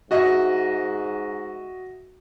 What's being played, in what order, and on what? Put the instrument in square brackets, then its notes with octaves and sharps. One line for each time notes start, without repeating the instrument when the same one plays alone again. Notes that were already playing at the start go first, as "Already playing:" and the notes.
[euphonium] G#2 [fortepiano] F#4 D#5 E5